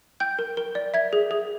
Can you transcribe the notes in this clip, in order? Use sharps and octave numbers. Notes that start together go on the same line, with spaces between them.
G5 G6
A#4
A#4
D5
E5 G#6
G#4
G#4